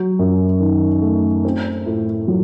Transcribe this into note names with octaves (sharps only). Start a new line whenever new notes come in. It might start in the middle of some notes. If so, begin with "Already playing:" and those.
Already playing: F#3
F#2
D#3
A3
C4
A2
F#3